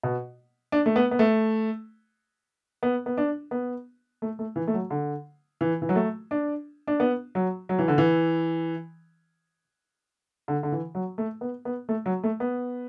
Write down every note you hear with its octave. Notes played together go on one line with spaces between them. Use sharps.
B2
D4
A3
B3
B3
A3
B3
B3
D4
B3
A3
A3
E3
A3
F#3
D3
E3
E3
F#3
A3
D4
D4
B3
F#3
F#3
E3
D3
E3
D3
D3
E3
F#3
A3
B3
B3
A3
F#3
A3
B3